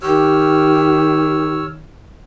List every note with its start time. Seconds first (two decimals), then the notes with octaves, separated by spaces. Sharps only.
0.02 D#3 G4 C#5 E6 F6